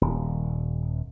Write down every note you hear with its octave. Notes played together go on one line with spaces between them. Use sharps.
D#1